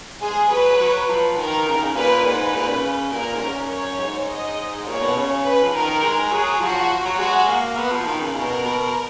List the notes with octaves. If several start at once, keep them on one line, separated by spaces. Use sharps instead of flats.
G#3 G#4
F#3 B4
F#3
F3
D#3 A#4
C#3
D#3
C#3
A#2 B4
G#2 B4
A#2
C#3
A#2 A#4
G#2
F#2
C#5
G#2
D#5
A#2 C#5
B2
C#3
B4
F3
D#3 A#4
G#3
F#3 G#4
F3 F#4
F#3
G#3 F#4
A#3
B3
F3
D#3
C#3
B2 A#4
B2